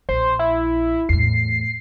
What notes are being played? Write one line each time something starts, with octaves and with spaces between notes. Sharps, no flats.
A#1 C5
E4
E2 A2 C7